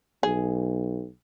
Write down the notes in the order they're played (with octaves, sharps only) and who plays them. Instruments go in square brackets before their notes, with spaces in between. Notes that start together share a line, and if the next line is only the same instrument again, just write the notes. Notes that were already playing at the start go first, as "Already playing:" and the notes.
[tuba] B1 [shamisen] G#4